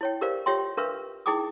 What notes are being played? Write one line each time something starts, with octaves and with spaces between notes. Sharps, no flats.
E4 C#5 G5
G4 A#4 C5 D5 F5
F4 G4 C#5 E5 G5 C6
D4 A#4 B4 E5 F5 C#6
D#4 E4 G#4 G5 D6 D#6